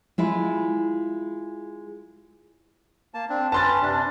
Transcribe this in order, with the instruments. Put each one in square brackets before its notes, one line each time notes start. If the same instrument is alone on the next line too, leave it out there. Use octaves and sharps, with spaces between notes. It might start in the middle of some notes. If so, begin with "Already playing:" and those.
[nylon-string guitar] G#3 E4 F4
[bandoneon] A#3 A5
C4 D4
[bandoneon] C#4 B4 [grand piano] A5 C6 A6
[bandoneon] C3 D4